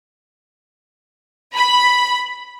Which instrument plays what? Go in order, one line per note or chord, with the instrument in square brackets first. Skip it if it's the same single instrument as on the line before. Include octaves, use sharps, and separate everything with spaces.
[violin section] B5